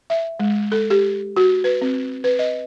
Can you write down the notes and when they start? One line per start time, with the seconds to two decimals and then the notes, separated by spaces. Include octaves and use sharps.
0.10 E5
0.40 G#3
0.72 A4
0.90 G4
1.37 F#4
1.64 B4
1.82 C4
2.24 B4
2.39 D#5